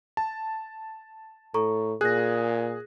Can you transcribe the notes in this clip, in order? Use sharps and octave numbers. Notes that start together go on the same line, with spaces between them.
A5
A2 A4 A#5 C#6
A#2 G#4 F#6 A#6